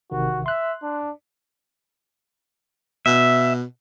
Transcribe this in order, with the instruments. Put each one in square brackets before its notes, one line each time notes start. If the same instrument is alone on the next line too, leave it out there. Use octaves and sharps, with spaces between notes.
[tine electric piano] A1 C3 D#3 [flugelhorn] F#4
[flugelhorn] E5 [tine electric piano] C6 F#6
[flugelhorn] D4
[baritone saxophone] B2 [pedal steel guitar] E5